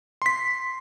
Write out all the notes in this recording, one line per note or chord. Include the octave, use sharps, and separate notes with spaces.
C6 B6